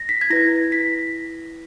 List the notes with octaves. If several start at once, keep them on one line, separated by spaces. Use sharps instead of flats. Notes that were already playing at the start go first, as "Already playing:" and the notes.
Already playing: A#6
B6
G#6
E4 B4 A#6
B6